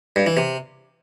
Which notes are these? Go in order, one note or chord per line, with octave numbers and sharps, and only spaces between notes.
G2
E3
C3